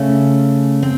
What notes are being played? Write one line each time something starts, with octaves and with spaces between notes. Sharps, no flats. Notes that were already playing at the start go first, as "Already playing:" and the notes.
Already playing: C#3 A3 C#4
C4